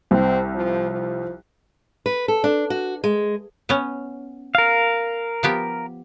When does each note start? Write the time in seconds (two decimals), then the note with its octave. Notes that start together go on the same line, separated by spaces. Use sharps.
0.11 C2 C4
0.55 F3
0.90 F3
2.06 B4
2.28 A4
2.44 D4
2.70 F#4
3.04 G#3
3.69 B3 C#4
4.55 A#4 F5
5.43 F3 B3 G4